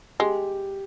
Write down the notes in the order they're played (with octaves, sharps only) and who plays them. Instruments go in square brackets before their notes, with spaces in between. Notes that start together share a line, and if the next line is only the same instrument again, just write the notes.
[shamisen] G#3 [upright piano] G4